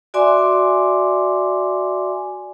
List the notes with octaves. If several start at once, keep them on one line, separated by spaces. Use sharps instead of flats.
F#4 D5 E5 G#5 C6 D6